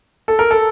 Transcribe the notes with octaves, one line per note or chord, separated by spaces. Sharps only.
A4
A#4
A4